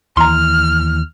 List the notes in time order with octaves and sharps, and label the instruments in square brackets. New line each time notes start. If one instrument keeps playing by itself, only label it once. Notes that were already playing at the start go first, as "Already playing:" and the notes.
[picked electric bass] D#2 E3 [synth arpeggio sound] A#5 C6 [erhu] F6